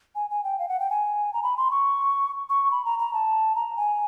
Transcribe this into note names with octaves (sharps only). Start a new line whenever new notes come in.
G#5
G#5
G5
F5
F#5
G5
G#5
A#5
B5
C6
C#6
C#6
B5
A#5
A#5
A5
A#5
G#5